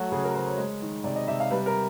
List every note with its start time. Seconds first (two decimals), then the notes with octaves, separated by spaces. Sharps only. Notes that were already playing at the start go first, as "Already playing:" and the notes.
Already playing: F#3 A3 F#4
0.12 C#3 G#4
0.24 A#4
0.34 C#3 C5
0.46 C#5
0.58 G#3
0.82 D#3
1.04 C3 D5
1.16 D#5
1.28 C3 E5
1.40 F5
1.51 G3 B4
1.66 A#4